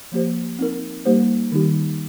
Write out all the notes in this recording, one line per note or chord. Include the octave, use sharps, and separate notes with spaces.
F3 A#3 G4 C5
C4 D#4 A#4
G3 A#3 D#4 G4 C5
D#3 G3 D#4 G4